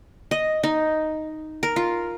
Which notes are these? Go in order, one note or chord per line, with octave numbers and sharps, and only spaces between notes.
D#5
D#4
A#4
F4